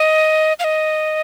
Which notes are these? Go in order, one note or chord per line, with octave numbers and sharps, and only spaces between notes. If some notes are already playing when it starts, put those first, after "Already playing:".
Already playing: D#5
F5
D#5